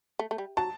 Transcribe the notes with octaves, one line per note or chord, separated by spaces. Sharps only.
A3
A3
G3
F#3 A5